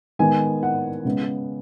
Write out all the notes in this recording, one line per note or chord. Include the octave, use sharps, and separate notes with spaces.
D#3 G#3 B3 G#5
F#5
C#3 G#3 B3